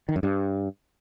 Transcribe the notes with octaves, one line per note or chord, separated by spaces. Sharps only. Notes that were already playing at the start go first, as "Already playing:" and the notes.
D#3
F#2
G2